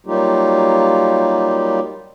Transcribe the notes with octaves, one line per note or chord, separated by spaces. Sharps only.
F#3 G3 A#3 D#4 F4 G4